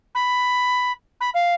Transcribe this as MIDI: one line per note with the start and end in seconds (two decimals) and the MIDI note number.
0.15 0.92 83
1.20 1.30 83
1.34 1.54 77